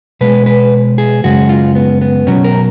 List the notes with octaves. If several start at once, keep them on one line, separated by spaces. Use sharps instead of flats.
B2 G#3 B4
B4
G#4
F#2 C#3 G#3 F#4
F4
B3
B3
B2 F#3 C#4
A#4